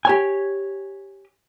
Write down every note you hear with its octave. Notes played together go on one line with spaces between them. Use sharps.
G4 C#5 G#5